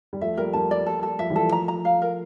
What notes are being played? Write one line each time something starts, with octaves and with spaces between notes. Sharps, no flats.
G3
F3 A3 E5
G3 A#3 A#4
G3 A#3 A5
D5
A4
A4
F3 E5
E3 G3
A4
F3 A3
A#5
A#5
F5
A#4